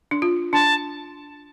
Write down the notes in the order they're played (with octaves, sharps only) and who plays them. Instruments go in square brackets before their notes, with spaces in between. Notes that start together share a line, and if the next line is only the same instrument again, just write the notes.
[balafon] D4
F4
[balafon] D4 [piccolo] A5